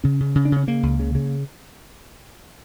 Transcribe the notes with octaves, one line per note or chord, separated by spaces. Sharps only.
C#3 C#4
C#3
C#3
D4
C#3 C#4
C#3 A#3
C#2
C#3
C#3